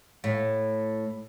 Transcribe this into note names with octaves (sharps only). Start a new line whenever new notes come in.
A2